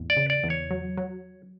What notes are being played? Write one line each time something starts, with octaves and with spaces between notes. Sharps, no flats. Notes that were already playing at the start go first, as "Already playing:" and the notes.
Already playing: E2 A2
D5
C#3
D5
E2
C#5
F#3
F#3